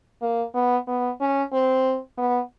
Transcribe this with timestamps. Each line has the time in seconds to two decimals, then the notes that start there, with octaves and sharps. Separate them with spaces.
0.22 A#3
0.54 B3
0.87 B3
1.20 C#4
1.53 C4
2.17 B3